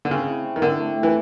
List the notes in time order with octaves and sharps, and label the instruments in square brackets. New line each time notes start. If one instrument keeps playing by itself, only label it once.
[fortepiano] D3
[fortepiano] C#3 [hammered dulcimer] C4
[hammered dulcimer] E4
C4
[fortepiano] D#3
[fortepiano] D3 [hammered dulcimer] C4
[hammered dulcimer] A3
C4
[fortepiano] E3